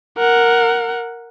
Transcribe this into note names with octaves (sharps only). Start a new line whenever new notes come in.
A#4 F#5